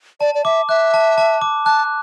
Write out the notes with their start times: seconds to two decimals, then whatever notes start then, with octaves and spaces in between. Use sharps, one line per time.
0.20 D5 A5
0.35 D5
0.45 E5 D6
0.69 E5 F#6
0.94 A5
1.18 A5
1.42 D6
1.65 A5 F#6